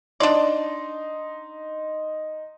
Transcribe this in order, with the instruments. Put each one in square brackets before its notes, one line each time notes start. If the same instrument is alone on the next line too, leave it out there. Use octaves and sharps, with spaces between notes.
[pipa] D4 D5 [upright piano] D#4 C6